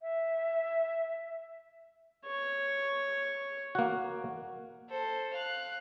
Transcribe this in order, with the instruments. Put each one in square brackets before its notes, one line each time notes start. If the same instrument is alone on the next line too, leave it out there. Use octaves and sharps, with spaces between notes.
[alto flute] E5
[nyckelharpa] C#5
[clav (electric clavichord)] A#3 F#4
[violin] A4 C5
F5 F#6